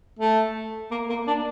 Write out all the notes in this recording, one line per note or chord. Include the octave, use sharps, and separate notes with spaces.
A3
A#3
A#3
D4